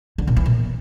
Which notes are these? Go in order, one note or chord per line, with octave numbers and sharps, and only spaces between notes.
D3
A#2
E3
A#2